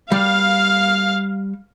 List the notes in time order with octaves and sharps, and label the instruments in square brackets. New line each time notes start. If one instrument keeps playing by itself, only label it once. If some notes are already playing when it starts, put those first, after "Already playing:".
[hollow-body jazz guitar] G3 [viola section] F5